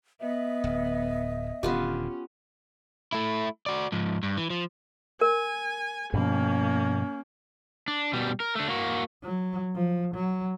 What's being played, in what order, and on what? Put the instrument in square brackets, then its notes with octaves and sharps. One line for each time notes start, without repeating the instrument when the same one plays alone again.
[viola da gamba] B3 [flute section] D#5 E5
[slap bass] D1
[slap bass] D#1 D3 [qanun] B3 F4 G4 [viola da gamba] C#4
[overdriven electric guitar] A3 E4
F#4 D5
G#2 F3
G2
E3
F3
[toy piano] A#4 [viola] G#5
[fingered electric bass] G2 B2 F3 [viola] A#3 [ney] C#4
[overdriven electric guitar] D4
B2 G3
A#4
A3 D4
A#3 F#4
[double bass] F#3
F3
F#3